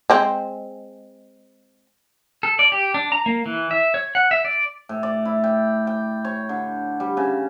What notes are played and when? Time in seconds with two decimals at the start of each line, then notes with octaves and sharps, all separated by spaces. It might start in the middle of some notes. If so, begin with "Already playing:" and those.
0.10 G#3 C4
2.43 A4
2.59 D5
2.72 G4
2.94 D4
3.12 A#5
3.26 A#3
3.46 E3
3.71 E5
3.94 C#5
4.15 F#5
4.31 E5
4.45 D5
4.89 A2
5.03 D5
5.25 E4
5.44 G5
5.87 G5
6.25 C#5
6.49 D3
7.00 G3
7.17 C#3